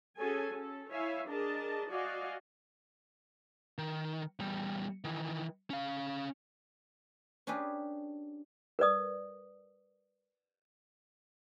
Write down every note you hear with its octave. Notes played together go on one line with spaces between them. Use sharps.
C#4 F#4 G#4 A4 G#5
C#4 A4
E4 C#5 E5 F5 G#5
D4 G#4 A#4 D#5 A5
F#4 D5 D#5 F5 G#5
D#3
E2 G3
D#3 E3
C#4 F5
C#4 D4 G4 G#4 B4
A#4 B4 D5 D#6